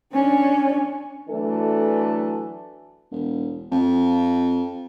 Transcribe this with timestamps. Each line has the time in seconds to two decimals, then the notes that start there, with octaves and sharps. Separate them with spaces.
0.13 C#4 D4
1.29 E3 F#3 A3 D4 A4
3.12 E1
3.72 F2